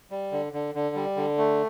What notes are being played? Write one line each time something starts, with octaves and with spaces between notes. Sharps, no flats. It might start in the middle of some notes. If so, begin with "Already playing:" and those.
G3
D3
D3
D3
G3
D3
A3